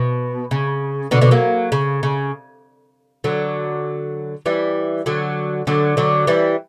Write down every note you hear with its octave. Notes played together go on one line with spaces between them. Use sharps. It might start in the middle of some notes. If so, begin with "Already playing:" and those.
Already playing: B2
C#3
B2 D3
B2 D3
F#3 A#3
C#3
C#3
D3 F#3
E3 G3
D3 F#3
D3 F#3
D3 F#3
E3 G3